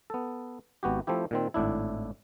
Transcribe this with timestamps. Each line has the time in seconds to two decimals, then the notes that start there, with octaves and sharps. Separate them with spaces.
0.10 B3 A4
0.83 G#1 B3 F#4 G4
1.07 F3 A3 C4 E4 G4
1.31 A#2 D#3 C4
1.54 G#1 A2 D4 E4